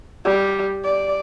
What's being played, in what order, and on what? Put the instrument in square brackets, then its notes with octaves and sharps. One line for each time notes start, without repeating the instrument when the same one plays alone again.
[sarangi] G3
D5